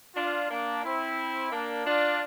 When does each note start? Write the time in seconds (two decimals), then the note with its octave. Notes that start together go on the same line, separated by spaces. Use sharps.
0.16 D4 F4
0.50 A#3 D4
0.84 C4 E4
1.52 A#3 D4
1.86 D4 F4